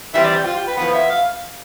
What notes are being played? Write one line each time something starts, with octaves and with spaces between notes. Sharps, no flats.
E3 G3 C4 E5
D5
G4
F4
G4
B4
A2 F3 B3 B4
E5
F5